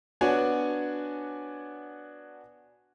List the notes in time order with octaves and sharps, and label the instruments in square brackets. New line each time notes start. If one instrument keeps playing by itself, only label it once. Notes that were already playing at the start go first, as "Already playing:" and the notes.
[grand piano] B3 D4 F#4 C#5 G#5